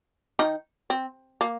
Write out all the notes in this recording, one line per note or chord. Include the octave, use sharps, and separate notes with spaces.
D#3 D#4
C4
A#3